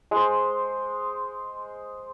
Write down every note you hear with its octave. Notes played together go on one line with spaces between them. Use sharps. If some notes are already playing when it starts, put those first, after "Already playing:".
G#3 C5